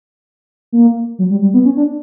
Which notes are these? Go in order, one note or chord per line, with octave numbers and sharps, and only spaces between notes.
A#3
F#3
G3
G3
B3
C#4
D4